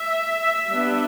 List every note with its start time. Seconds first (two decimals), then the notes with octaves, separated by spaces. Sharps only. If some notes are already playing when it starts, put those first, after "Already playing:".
Already playing: E5
0.70 G3 B3 D4